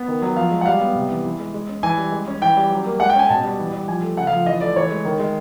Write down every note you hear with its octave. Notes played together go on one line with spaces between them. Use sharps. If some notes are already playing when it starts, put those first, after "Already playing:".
Already playing: B3
D#3
F#3
F3 F5
G#3
F#5
G3 F5
B3
C3
E3
E3
G#3
G#3
C#4
E3 G#5
G3
G#3
C#4
E3 G5
G3
F#3
A#3
G#3 F#5
G5
C#4 G#5
B2 A5
G3
E3
G3
F3 G#5
A3
C#3 F#5
F5
F3
E3 D#5
A3 D5
E3 C#5
G#3
D#3
G#3